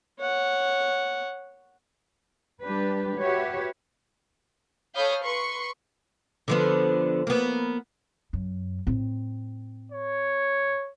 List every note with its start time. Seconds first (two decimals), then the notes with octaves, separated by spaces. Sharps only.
0.20 C#5 F#5
2.62 G3 D4 G4 B4
3.19 F#4 G4 B4 C#5 E5
4.95 A4 C#5 F5 B5 D#6 G6
5.24 B4 C6 C#6 C#7
6.48 D3 F3 B3
7.27 A#3 B3
8.33 F#2
8.87 A2 C4
9.92 C#5